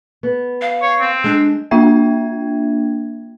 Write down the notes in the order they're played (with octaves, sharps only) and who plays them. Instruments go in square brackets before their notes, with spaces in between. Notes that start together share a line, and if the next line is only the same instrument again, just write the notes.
[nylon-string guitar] B3
[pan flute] F5
[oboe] C#5
C4
[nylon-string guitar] G#3 [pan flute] D4
[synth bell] A#3 D4 F4 E5 G5 G#6